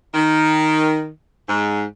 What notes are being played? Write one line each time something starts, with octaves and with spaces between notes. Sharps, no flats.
D#3
G#2